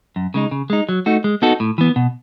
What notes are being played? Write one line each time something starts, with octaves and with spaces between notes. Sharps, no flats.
F#2
C#3 G#3 D#4
C#3
G#3 D#4
F#3
A3 D#4 F#4
G#3
B3 D#4 F#4 A4
A2
E3 B3
B2